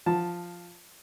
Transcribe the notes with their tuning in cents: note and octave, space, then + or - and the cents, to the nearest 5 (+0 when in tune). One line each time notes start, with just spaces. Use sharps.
F3 +0 A5 +0